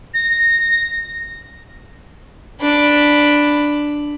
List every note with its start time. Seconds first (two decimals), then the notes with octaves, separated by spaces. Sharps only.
0.14 A#6
2.61 D4 B5